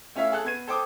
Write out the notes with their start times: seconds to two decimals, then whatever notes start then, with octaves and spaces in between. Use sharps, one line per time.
0.16 A3 C#4 E4 E5 F5
0.32 G#4 A4 F#6
0.45 B3 G#6 D#7
0.67 A4 C5 G5 D6 D#6